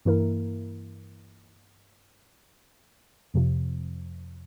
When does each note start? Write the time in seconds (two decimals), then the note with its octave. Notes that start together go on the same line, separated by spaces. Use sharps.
0.05 G2 E3 A#3 E4 A#4
3.34 F2 C3 F3